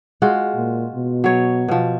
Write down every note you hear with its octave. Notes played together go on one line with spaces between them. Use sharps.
G#3 F4 F#4
A#2
B2
F#3 C#5
B2 F3